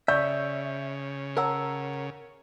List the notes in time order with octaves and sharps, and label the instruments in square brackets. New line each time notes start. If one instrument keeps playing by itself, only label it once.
[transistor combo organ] C#3 [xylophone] D5 C#6 [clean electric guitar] E5 [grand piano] G6
[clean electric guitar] A#4 F#5 A#5 [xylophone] C#5 A5 E6